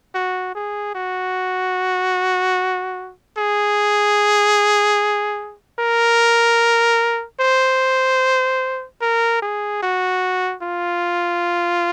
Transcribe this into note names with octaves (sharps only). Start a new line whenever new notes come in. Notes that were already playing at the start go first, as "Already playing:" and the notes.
F#4
G#4
F#4
G#4
A#4
C5
A#4
G#4
F#4
F4